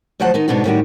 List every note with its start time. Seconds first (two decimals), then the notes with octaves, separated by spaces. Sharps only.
0.20 D2 F3 F#3 C5 F#5 A5
0.34 D#3 B3 D#4
0.48 G#2 B2 D3 B3 D4 F#4
0.64 A2 D#3 G3 F#4 G4